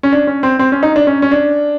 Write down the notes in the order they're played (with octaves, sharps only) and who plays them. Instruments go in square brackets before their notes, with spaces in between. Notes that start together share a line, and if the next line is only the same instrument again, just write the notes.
[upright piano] C#4
D4
C#4
C4
C4
C#4
D#4
D4
C#4
C#4
D4